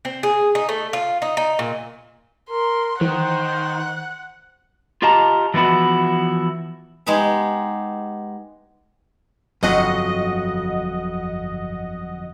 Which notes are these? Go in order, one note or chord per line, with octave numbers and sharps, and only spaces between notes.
C4
G#4
D#4
A3
F4
D#4
D#4
A#2
A#4 C6
D#3 E3 C5 F#5
F4 G4 D#5 F5 A5 A#5
E3 F3 B3 E4 F#4
G#3 B3 D#4 G4 G#4
G1 F2 F#3 D#5 F#5